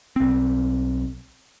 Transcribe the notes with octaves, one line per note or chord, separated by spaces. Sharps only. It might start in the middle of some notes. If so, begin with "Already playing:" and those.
B1 C4